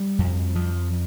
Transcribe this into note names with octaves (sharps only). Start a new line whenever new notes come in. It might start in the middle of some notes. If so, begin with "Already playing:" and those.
Already playing: G3
F2
F3